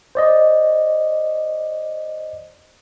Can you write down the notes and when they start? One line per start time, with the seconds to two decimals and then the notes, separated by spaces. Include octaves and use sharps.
0.15 C5 D5 D#5